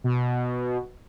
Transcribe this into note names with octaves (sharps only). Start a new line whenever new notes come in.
B2